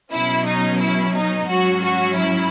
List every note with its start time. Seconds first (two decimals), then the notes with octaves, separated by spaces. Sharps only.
0.12 B2 F#3 C#4 E4
0.47 D#4
0.80 E4
1.15 D#4
1.49 G#2 F#3 C#4 F#4
1.83 F#4
2.17 E4